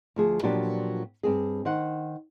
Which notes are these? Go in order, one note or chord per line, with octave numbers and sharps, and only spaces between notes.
D2 F3 G#4
A#2 F3 F#3 B3 D4 G4
G2 C4 G#4
D#3 C5 F#5